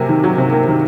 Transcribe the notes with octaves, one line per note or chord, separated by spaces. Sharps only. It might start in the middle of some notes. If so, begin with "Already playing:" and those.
Already playing: C3 F#3 A#3 G#5
D#3
F#3
C3
A#3
D#3